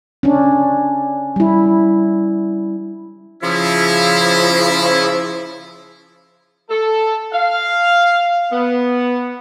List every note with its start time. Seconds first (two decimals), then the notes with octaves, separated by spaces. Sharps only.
0.23 C#4 D4
1.36 G3 E4
3.43 C#3 F3 E4
6.70 A4
7.33 F5
8.52 B3